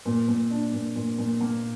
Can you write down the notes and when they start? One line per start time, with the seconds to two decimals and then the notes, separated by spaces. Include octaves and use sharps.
0.05 A#2
0.28 A#2
0.50 D4
0.73 A#2
0.96 A#2
1.18 A#2
1.41 A#3